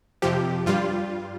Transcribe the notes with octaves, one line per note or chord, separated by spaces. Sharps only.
F2 C3 F3 G4
G2 G3 F4